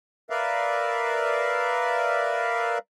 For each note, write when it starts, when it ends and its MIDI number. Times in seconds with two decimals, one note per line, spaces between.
0.30 2.78 70
0.30 2.78 71
0.30 2.78 74
0.30 2.78 76
0.30 2.78 77